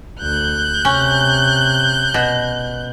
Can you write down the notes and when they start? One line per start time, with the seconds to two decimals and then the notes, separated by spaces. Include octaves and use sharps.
0.20 D2 F#6 G6
0.85 C3 C#4
2.14 B2